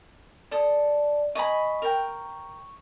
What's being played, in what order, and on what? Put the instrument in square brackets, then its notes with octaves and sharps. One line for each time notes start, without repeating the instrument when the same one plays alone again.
[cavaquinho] A4 D#6 [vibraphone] D5
[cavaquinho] D#5 G#5 B5 [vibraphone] C#6
[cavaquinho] A#4 G5